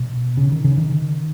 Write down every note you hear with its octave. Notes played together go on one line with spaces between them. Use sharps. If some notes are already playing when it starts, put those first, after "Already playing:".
Already playing: B2
C#3
D#3
C#3
D#3